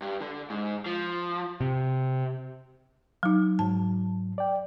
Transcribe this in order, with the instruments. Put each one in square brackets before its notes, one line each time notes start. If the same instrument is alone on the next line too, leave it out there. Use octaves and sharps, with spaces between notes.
[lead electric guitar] G2
D3
G#2
F3
[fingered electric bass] C3
[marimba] F#3 D#4
[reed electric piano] G#2 F#3 [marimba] A5
[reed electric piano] D5 G5